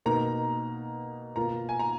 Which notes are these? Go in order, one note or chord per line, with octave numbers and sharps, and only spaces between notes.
B2 A#3 D#4 A#5
B2 A#3 F4 A#5
G#5
A#5